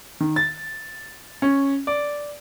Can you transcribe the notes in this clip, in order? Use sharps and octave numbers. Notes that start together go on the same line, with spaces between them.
D#3
A6
C#4
D5